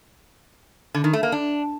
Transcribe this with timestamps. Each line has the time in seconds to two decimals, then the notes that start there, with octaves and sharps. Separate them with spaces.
0.94 D3
1.04 D#3
1.13 A3
1.23 A#3
1.32 D4